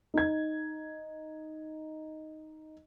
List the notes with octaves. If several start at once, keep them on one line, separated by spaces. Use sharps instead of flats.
D#4 G#6